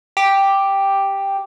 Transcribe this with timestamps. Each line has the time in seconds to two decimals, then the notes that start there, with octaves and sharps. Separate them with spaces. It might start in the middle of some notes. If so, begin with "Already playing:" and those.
0.17 G4